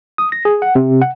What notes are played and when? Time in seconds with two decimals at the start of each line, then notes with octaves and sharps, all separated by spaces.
0.18 D#6
0.32 A#6
0.45 G#4
0.62 F#5
0.75 C3
1.02 F#5